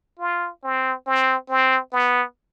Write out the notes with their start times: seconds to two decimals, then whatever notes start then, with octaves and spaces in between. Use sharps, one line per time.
0.19 F4
0.63 C4
1.07 C4
1.49 C4
1.93 B3